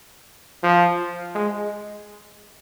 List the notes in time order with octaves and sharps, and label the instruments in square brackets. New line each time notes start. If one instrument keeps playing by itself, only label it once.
[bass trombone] F3
G#3